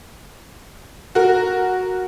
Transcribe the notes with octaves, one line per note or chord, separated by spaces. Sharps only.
F#4 A#4